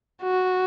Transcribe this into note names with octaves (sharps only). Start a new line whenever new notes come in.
F#4